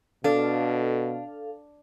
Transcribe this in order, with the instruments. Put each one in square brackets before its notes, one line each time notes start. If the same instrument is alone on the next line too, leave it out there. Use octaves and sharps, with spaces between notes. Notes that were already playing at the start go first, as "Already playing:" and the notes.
[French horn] B2 [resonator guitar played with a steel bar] D4 [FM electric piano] A4 F5